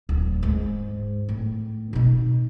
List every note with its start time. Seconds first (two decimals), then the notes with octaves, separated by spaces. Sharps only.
0.09 D1
0.43 G#2
1.29 A2
1.93 B2 D#4